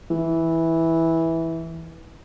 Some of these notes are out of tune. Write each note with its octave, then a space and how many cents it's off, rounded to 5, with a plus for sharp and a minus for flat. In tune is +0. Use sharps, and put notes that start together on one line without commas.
E3 -10